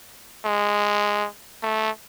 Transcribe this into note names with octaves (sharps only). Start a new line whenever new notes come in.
G#3
A3